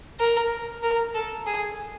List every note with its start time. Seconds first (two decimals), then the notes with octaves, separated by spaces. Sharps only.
0.20 A#4
0.83 A#4
1.14 A4
1.47 G#4